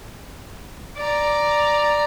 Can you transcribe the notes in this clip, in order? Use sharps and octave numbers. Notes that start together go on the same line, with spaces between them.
D5 A#5